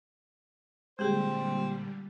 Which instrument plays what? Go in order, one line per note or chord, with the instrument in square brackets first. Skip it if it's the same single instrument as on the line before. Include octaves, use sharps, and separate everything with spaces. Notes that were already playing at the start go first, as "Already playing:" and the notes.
[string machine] A#2 D3 G3 [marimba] G#3 G4 G#4 [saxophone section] C4 C5